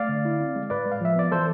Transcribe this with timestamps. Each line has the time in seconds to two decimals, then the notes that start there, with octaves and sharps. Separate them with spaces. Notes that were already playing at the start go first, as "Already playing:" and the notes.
Already playing: A3 D5 F5
0.09 D3
0.25 E4
0.39 C4
0.56 G#3
0.70 A2 B4 D5
0.85 G#3
0.92 F5
1.01 F3 E5
1.16 B3 D5
1.32 E3 A4 C5